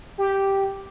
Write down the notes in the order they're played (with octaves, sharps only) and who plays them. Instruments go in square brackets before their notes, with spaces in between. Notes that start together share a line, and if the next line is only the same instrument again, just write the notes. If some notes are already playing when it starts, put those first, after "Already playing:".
[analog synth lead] G4